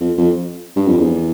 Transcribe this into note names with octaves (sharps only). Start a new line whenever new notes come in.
F2
F2
G2
F2
E2